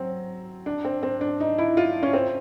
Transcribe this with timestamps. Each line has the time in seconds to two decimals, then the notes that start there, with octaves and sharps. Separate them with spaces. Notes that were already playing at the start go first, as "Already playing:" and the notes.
Already playing: F#3 C4
0.66 D4
0.85 C4
1.03 C4
1.21 D4
1.40 D#4
1.58 E4
1.77 F4
2.03 C#4
2.13 C4